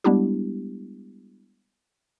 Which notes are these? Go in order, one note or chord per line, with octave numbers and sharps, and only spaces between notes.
G3 G#3 B3 D4 E4 G4